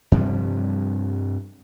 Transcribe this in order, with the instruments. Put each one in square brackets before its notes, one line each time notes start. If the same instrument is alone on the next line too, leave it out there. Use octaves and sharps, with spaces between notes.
[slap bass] G2 C3 F3 G3